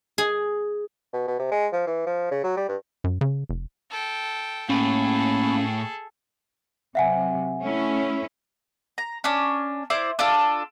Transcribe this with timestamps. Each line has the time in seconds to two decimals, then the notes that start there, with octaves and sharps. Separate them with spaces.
0.18 G#4
1.13 B2
1.28 B2
1.39 C3
1.52 G#3
1.72 F3
1.87 E3
2.06 F3
2.31 C#3
2.44 F#3
2.57 G3
2.68 G2
3.04 F#2
3.21 C#3
3.49 F1
3.90 A4 G5
4.69 A2 A#3 C#4 G#4 A4 B5
6.95 C3 F#3 E5 F#5 G#5
7.60 A3 C#4 E4
8.98 A#5
9.24 C#4 D4
9.90 E4 C5 D5
10.19 D4 F4 A4